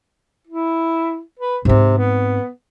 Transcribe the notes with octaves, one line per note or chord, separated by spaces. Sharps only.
E4
B4
G#2 C3 C4
B3